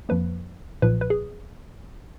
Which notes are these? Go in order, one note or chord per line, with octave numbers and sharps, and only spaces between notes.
F2 F3 A#3 B4
B1 A#2 F3 B4
B4
G#4